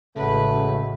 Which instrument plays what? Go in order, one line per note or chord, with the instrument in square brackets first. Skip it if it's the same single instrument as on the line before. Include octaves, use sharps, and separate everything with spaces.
[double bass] A1 D2 [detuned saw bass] C#3 [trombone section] G#3 A3 F#4 [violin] B4